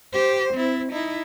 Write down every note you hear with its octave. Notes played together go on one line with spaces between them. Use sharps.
G4 C5
C4 E4
D#4 E4